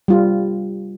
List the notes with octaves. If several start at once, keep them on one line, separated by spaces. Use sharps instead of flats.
G3 F4